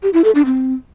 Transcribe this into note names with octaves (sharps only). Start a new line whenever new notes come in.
G4
E4
A4
D4
C4